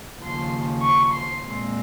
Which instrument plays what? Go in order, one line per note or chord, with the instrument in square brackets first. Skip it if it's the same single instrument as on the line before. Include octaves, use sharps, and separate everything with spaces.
[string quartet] D#2 C#3 F3 C6
C#6
C6
A#2 G#3 C4